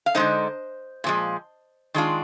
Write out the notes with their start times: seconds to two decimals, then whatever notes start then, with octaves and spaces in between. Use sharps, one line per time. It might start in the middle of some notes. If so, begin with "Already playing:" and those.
0.06 F5
0.15 D3 G#3 D#4 C5 D#5
1.04 A#2 F3 G#3
1.94 D#3 G#3 D4 F4